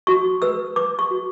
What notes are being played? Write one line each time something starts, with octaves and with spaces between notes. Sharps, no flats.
F#4 C#6
B4 E6
B4 D6
C#6
F#4